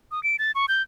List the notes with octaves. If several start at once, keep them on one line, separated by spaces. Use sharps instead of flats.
D#6
D7
A6
C#6
G6